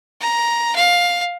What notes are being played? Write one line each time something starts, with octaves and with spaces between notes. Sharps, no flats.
A#5
F5